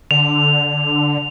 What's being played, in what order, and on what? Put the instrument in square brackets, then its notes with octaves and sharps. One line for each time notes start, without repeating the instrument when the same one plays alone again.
[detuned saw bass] D3 [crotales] F7
[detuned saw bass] D3